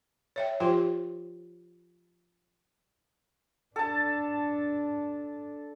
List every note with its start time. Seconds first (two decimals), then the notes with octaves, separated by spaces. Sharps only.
0.36 C#5 E5 G5
0.60 F3 F4 G4 C5 G5 C6
3.76 D4 A4 A5